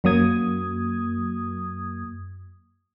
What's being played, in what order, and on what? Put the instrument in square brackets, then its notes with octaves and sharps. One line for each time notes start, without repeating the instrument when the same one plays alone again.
[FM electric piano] F#2 F#3 A#3 D#6 G#6